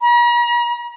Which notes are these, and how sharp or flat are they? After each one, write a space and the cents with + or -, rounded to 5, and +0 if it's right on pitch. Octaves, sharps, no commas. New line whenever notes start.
A#5 +45